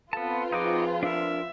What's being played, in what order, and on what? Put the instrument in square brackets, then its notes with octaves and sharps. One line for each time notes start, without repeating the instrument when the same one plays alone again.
[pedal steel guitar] B3 A5 [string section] C4 F4 B4 [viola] A4
[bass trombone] F3 [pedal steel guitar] D#4 F#4 D6 [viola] G#4
[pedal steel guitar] D4 A#4 [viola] E5